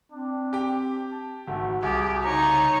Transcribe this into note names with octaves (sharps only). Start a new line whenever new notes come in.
C4 D4
G4 G5
A5
G#1 A3 F#4
C2 G4 G#4
C#3 D#4 C#5 A#5